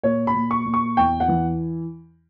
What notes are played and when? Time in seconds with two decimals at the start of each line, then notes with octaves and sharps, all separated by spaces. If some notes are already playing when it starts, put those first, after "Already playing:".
0.03 A#2 C#5
0.27 B5
0.35 A#2
0.51 C#6
0.66 A#2
0.74 C#6
0.97 E2 G5
1.20 F#5
1.28 E3